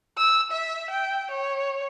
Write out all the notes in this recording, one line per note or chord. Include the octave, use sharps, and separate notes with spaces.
E6
E5
G5
C#5